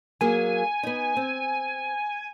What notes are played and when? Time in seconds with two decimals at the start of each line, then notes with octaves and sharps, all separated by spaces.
0.21 F#3 A#3 G#4 G#5
0.83 B3 D#4
1.17 C4